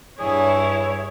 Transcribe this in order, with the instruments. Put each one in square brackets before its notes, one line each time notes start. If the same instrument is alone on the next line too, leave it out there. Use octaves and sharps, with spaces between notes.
[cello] G2 E4 [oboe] G#4 [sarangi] C#5